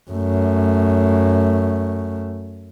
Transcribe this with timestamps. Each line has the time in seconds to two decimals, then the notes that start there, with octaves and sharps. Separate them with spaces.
0.11 F#2 A3